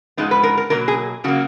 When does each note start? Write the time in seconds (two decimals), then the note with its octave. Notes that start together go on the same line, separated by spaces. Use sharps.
0.17 G#2 F3 G#3 B3 D#4
0.31 B4
0.43 A#4
0.57 A#4
0.70 B2 F#3 A#3 A#4
0.88 G#4
1.24 C#3 F#3 A#3 F#4